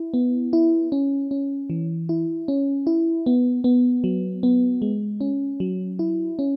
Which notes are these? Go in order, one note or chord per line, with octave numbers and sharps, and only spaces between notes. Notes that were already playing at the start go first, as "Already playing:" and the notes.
Already playing: E4
B3
E4
C#4
C#4
E3
E4
C#4
E4
B3
B3
F#3
B3
G#3
C#4
F#3
E4
C#4